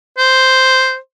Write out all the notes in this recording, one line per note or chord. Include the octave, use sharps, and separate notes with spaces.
C5